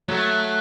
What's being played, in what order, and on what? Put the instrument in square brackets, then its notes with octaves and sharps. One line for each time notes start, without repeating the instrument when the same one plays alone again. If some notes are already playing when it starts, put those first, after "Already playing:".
[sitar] F#3 [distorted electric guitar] A3